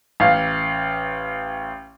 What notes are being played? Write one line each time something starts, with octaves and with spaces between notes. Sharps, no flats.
A1 F5